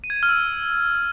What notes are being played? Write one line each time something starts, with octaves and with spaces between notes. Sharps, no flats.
D#7
G#6
D#7
F6
E6